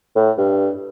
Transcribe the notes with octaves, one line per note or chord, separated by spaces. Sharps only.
A2
G2